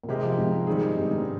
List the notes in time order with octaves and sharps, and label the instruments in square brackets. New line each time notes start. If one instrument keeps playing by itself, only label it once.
[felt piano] A#2
[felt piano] C3 [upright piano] G#3 C4 G4 A#4 D#5
[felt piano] F3
G#2
[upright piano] D#3 G3 C4 D#4 G#4
[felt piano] G2
G#2